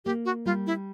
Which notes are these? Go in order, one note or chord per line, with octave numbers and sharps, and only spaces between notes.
A#3 G4
F#4
G3 F4
E4